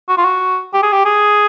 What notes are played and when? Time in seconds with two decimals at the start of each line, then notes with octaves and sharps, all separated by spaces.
0.09 F#4
0.17 F4
0.25 F#4
0.74 G4
0.83 G#4
0.93 G4
1.05 G#4